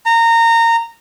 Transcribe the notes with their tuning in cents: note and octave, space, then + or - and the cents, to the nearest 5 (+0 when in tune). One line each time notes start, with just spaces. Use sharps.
A#5 -20